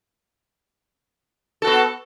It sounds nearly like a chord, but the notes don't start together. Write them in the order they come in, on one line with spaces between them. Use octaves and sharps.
A4 F#4 B3